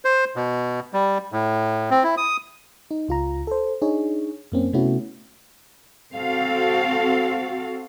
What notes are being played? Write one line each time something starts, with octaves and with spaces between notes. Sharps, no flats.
C5
B2
G3
A2
C4
E4
D#6
D#4
C#2 F4 A#5
A4 C5
D4 D#4 G#4 C#5
F#2 A#3 C4 C#4
C3 A3 B3 C#4 E4 F#4
C4 F#4 A4 F5